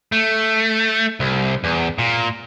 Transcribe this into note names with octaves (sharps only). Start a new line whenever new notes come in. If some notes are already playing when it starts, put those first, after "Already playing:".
A3
C2
E2
A#2